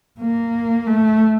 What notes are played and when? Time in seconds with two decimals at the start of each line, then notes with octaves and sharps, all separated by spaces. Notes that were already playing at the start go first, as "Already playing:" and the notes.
0.20 A#3
0.87 A3